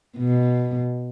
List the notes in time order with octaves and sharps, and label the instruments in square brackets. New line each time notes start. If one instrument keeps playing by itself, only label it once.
[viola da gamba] B2